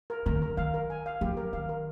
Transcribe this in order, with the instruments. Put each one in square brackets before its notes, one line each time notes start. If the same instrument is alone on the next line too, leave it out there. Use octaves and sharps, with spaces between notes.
[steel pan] A#4
[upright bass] D#3 [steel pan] A#4
[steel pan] A#4
[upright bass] D#3 [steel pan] F5
[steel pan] A#4
G#5
F5
[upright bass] F3 [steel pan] G4
[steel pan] A#4
[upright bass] D#3 [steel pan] F5
[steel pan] A#4